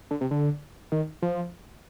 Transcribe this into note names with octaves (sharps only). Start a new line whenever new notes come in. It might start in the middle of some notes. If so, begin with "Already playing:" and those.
D3
C3
D3
D#3
F3